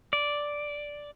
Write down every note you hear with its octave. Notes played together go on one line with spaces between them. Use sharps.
D5